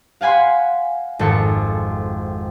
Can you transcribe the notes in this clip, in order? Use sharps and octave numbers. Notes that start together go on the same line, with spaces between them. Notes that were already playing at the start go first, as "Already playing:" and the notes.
F5 F#5 G#5 B5 C6
G#1 F2 A4 C#7